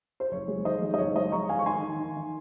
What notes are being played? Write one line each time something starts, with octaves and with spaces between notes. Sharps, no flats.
C5
F#1 C#5
G#3
D#3 C5 D#5
G#3
D#5
F#1 C#5
G#3 C5 D#5
G#3 A#5 C#6
D#3 F5 G#5
C#6
D#3 G#5 C6
D#3
D#3
D#3